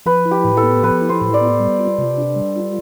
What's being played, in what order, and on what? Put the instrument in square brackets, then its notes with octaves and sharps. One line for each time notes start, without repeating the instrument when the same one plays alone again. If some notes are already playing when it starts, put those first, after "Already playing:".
[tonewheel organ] F3 [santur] B4
[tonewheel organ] E4
[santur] G4
[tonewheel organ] A2
[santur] A4
[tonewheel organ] B3
[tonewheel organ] F3 [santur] B4
[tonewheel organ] E4
[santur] C5
[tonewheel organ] A2
[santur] D5
[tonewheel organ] B3
G3
F4
C3
D4
G3
F4